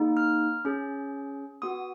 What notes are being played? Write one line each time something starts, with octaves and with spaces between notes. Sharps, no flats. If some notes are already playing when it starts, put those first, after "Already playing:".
Already playing: A#3 D#4 G#4
F6
C#4 G#4
B3 F#4 D#6